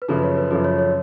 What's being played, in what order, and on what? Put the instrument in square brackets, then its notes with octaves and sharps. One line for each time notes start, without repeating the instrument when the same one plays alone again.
[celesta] B4
[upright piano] F#2 C#3 F3 [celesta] A4
[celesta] B4
C#5
B4
[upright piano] F#2 C#3 F3 [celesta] A4
[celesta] C#5
C#5